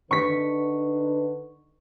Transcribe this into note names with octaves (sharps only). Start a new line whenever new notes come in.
D3 D#4 B4 C#6 B6